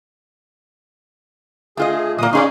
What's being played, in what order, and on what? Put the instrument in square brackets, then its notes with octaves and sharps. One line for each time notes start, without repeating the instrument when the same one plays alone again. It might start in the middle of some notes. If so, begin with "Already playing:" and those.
[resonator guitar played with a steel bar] A3 F4 D#5 [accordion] G#4
[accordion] A#2 D#6 [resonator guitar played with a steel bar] G#3 A#3
[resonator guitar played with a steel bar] C#4 G#4 D5 [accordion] D#4 F5 C6